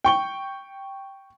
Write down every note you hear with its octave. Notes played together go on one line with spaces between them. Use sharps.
G5 C#6 G7